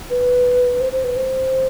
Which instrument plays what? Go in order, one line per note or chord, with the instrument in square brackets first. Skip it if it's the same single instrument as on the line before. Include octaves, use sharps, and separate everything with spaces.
[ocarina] B4
C5
C5
B4
C5